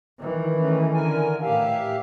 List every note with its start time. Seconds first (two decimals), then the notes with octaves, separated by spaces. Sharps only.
0.19 D#3 E3
0.57 A3 C#4
0.94 D3 A#4 G#5
1.42 A2 G4 E5 F5